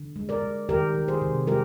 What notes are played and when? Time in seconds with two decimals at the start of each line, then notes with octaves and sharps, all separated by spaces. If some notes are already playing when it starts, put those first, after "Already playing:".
Already playing: D3
0.16 G#3
0.29 A#4 D5
0.42 G#3
0.69 D#3 G4 A#4
0.94 D#3
1.08 G#4 C5
1.22 C3
1.47 G#3 G4 A#4